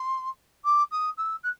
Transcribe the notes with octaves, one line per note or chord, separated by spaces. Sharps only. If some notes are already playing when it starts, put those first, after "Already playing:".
Already playing: C6
D6
D#6
E6
F#6